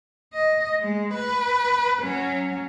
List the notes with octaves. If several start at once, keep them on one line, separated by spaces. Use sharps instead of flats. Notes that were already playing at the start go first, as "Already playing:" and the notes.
D#5
G#3
B4
F#3 C#4